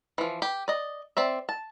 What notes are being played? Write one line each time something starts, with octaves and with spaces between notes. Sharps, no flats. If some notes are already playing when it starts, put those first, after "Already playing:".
E3 F3
G4
D5 D#5
C4 D5 E5
A5